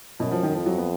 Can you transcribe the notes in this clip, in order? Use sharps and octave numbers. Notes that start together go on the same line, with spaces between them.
F#2 B2
F3
D#3
F2 F3
F#3
B3